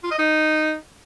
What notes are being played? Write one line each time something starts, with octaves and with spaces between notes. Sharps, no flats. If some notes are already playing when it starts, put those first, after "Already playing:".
F4
D#5
D#4